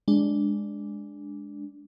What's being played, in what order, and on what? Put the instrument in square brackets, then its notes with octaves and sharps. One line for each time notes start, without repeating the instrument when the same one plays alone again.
[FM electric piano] G#3 D4